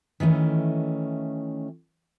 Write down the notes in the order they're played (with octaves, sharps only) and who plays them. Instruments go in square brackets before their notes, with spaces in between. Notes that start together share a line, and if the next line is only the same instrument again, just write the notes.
[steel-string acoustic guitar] D#3 E3 A3 C#4